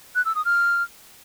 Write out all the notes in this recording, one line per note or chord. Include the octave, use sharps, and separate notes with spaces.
F#6
E6
D#6
F6